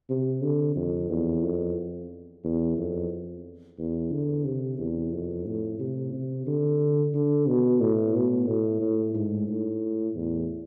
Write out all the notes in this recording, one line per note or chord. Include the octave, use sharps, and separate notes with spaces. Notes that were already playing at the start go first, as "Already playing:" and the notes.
C3
D3
F2
E2
F2
E2
F2
E2
D3
C3
E2
F2
A2
C3
C3
D3
D3
B2
A2
B2
A2
A2
G#2
A2
E2